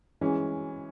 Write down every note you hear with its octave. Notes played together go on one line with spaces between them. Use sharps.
E3 G#3 C#4